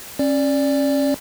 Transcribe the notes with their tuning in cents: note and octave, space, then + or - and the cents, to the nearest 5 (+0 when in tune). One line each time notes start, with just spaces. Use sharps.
C#4 -25 D5 -5